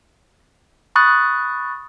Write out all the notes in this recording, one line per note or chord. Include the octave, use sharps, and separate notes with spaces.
B5 C#6 D#6 F#6 A6